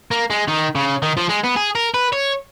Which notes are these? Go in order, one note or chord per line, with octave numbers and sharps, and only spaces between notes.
A#3
G#3
D#3
C#3
D#3
F3
G#3
B3
G#4
A#4
B4
C#5